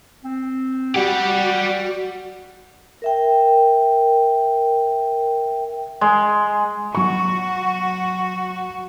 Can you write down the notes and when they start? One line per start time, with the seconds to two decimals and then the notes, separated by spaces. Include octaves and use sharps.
0.24 C4
0.95 G3 F#4 G4 F#5
3.02 A#4 E5 G5
6.01 G#3
6.95 F#3 F#4 C#6